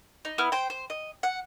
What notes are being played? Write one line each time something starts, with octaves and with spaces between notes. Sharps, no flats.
D#4
B3 E4 F6
C5 G5
C5
D#5
F#5